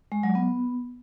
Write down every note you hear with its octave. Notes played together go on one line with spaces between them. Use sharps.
G#3
F#3
B3